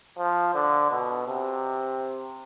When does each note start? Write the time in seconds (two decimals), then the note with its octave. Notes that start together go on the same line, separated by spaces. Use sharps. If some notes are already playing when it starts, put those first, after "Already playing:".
0.18 F3
0.55 D3
0.91 B2
1.27 C3